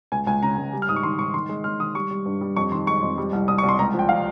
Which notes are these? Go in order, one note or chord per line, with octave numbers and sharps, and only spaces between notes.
C#2 G#5
C#2 G#5
C#3 A#5
C#2
G3
F6
G#2 D#6
C#6
D#3 C6
G#2 C#6
D#3 C6
G#3
G#3 F6
D#3 D#6
G3 C#6
G3
G2
G3
F2 C#6
D#3 C6
G#3 C#6
F2
G3
C2
C2 D#6
C#6
C2
C6
C#2 A#5
F3
G5
F3 F5